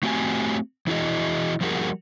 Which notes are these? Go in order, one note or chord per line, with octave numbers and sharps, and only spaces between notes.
A3 C4 F#4 G4 C#5 G#5
E3 E4 F#4 G#4 D#5
F3 G3 A#3 F#4 G#4 A#4